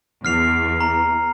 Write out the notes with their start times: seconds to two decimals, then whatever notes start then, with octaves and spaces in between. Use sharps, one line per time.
0.25 E2 F6 C7 F7
0.81 A#5